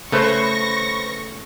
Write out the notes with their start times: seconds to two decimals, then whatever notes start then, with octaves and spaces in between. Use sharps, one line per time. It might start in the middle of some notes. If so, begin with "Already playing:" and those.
0.12 C#3 A3 A4 B4 C5 C#6 A#6